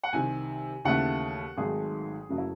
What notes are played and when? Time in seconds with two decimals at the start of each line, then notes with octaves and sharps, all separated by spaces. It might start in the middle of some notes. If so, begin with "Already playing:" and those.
0.04 F#5
0.13 C2 C3 D#3 G#5
0.85 D#2 C#3 E3 A3 F#5
1.57 G#1 G#2 D#3 F#3 A3 G#4
2.29 F#1 C#3 F#3 A3 F#4
2.38 E4